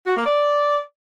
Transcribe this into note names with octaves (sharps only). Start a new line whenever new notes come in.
F#4
A#3
D5